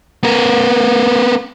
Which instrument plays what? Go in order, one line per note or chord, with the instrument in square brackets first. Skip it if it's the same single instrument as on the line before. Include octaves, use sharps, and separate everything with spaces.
[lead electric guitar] B3 A#4